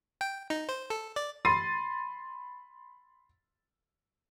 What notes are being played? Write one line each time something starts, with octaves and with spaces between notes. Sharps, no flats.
G5
D#4
C5
A4
D5
B5 C6 A6 C7 D#7